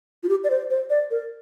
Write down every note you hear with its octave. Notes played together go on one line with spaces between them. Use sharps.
F4
G4
D5
C5
C5
D5
A#4